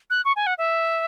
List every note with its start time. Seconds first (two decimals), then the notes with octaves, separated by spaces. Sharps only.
0.10 F#6
0.25 C#6
0.36 G#5
0.47 F#5
0.58 E5